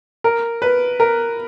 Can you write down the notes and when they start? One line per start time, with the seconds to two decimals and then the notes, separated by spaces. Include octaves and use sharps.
0.24 A#4
0.62 B4
1.00 A#4